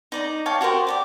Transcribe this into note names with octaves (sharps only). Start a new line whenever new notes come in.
D#4 D5 A#5
C#5 F5 G5 A5
F#4 G4 A#4 C5
G4 D5 D6